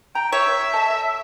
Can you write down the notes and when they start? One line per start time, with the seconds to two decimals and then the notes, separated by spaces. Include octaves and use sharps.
0.15 G5 A#5
0.32 C#5 E5
0.73 A4 D#5 A5